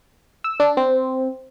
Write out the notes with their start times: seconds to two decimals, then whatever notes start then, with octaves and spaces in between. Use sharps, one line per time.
0.44 E6
0.60 D4
0.77 C4